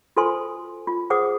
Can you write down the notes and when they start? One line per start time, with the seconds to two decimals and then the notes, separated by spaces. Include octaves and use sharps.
0.17 F4 F#4 A4 C5 G#5 C6
0.87 F4
1.10 G#4 C5 F#5 D6 D#6